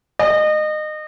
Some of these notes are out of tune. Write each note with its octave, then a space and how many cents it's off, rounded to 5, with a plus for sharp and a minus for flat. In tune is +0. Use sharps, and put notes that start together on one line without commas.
D#5 -25